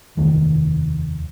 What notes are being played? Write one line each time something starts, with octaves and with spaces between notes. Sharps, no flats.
F1 D#2 D#3